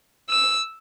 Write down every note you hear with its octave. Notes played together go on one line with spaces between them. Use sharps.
E6